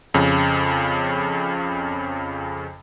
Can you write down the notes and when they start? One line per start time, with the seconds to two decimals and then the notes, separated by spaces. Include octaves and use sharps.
0.14 F2 C#3